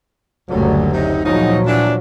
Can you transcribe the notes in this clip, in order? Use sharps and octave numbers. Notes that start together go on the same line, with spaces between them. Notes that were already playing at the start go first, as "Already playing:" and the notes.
F#1 D2 A#2 D3 F#3 G3
C3 D#4
E2 A#2 C#3 F3 F#3 D#4
E3 G3 D4